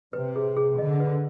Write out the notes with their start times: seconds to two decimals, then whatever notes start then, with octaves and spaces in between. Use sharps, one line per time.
0.13 C3 B4
0.36 G#4
0.57 G#4
0.78 D3 D#5
1.00 B4